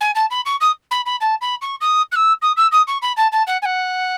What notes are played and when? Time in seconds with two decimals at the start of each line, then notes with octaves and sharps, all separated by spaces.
0.01 G#5
0.15 A5
0.31 B5
0.46 C#6
0.61 D#6
0.91 B5
1.06 B5
1.21 A5
1.41 B5
1.62 C#6
1.81 D#6
2.12 F#6
2.16 E6
2.42 D#6
2.57 E6
2.72 D#6
2.87 C#6
3.02 B5
3.17 A5
3.32 A5
3.47 F#5
3.62 G#5
3.65 F#5